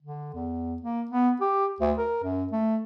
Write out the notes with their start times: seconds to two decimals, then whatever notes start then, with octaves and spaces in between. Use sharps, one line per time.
0.02 D3
0.34 E2
0.82 A#3
1.11 B3
1.41 G4
1.80 D2
1.98 A#4
2.23 F#2
2.52 A3